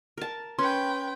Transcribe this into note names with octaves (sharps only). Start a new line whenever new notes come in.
A#4 A5
C#4 B4 G5 C6